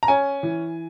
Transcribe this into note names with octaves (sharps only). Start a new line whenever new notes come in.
A#5
C#4 G#5
E3